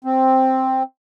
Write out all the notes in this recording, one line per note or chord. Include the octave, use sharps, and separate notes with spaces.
C4